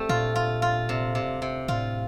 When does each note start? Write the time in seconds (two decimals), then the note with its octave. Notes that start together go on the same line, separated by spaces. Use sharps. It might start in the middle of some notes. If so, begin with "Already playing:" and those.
Already playing: A3 C4 G4
0.09 A#2 F4
0.36 F4
0.62 F4
0.89 C3
1.15 C3
1.42 C3
1.68 A2 F4